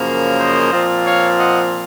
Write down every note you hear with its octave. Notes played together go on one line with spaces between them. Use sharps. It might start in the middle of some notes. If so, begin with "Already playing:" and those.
Already playing: F#2 C#3 F3 A#3
C5 D#5
A#2 F3 C4 F4
C#5 F5
D#5 F#5